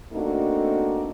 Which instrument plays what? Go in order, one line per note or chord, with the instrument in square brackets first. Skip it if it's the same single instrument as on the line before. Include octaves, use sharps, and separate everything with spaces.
[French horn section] A3 A#3 C4 D4 D#4 F#4